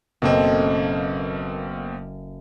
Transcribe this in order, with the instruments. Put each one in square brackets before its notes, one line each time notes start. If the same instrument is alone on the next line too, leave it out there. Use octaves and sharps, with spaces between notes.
[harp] F#1 A4 D#5 [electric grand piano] B2 A#3 C4